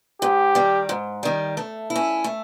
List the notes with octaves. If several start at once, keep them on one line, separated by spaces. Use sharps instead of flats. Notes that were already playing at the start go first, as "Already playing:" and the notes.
G#2 G4
D#3 G3
G#2
D#3 G3
A3
E4
C#4
A3